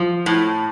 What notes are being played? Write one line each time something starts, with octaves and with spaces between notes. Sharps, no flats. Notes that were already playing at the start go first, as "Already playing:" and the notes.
Already playing: F3
A2